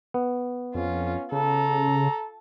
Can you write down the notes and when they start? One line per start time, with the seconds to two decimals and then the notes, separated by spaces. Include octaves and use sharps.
0.14 B3
0.75 F2 C#4 F4
1.32 C#3 A4 A#5